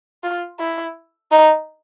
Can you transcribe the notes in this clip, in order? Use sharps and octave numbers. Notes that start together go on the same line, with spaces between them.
F4
E4
D#4